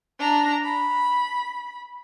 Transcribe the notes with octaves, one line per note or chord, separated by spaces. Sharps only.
D4 A#5
B5